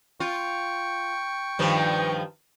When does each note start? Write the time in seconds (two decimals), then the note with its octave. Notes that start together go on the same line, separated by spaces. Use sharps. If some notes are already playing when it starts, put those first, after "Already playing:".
0.20 F4 G5 C#6
1.59 G2 D#3 F3